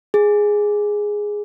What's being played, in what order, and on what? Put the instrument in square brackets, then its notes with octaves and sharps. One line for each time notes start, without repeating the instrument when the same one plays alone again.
[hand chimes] G#4